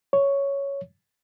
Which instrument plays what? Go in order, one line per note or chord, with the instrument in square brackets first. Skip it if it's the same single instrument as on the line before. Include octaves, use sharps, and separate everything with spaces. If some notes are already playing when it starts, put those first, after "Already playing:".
[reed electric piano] C#5